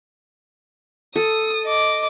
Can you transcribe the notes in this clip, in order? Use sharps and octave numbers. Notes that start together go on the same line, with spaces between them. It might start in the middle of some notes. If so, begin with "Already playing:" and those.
A4 D#6
D#5 D6